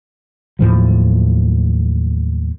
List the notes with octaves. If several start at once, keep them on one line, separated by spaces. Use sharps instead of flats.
D#2 A2 F3 F#3